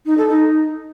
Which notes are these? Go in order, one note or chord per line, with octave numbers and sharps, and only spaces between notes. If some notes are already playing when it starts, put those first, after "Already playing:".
D#4
A4
D#4